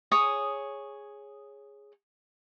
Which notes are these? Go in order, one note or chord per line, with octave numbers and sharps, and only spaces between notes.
G#4 C#5 D#6